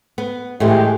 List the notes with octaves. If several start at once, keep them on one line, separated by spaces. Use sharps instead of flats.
B3
A2 E3 G#3 G4